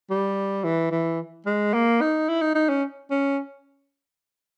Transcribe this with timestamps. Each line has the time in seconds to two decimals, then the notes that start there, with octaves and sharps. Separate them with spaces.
0.10 G3
0.64 E3
0.91 E3
1.46 G#3
1.74 A#3
2.01 D#4
2.29 E4
2.41 D#4
2.55 D#4
2.69 C#4
3.11 C#4